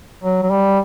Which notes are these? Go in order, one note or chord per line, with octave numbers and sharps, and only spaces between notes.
F#3
F#3
G3